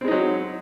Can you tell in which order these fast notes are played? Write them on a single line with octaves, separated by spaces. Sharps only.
C4 G#3 D#4 F#3